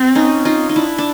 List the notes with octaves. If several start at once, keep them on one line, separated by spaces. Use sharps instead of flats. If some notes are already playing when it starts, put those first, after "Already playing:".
Already playing: C4
C#4 D#4
D#4 F4
D#4
D4 E4
D4